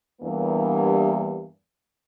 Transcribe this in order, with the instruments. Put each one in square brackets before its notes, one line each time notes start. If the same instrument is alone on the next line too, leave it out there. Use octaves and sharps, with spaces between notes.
[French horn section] E2 G2 A#3